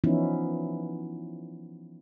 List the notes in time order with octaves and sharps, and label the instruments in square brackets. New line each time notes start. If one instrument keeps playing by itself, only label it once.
[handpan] E3 F3 B3 C#4 D#4 E4